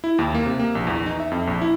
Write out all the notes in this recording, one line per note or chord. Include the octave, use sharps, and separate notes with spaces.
E4
D#2
A#3
C3
A#3
A#1
E2
D#4
E5
F2
A#1
E4